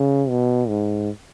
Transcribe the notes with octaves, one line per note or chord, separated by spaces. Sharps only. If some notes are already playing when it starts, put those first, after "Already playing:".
Already playing: C#3
B2
G#2